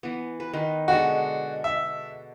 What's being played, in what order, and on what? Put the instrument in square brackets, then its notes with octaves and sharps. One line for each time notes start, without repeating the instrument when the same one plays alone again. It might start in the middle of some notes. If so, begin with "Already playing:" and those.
[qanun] E3 B3
B4
D#3 B4 C6
[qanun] B2 D3 G#3 [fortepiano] F#4
[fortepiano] E5